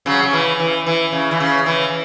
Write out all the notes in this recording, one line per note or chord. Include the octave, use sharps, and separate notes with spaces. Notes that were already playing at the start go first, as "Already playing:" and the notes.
C#3 F#3
C#3
E3
E3
E3
C#3
E3
C#3
E3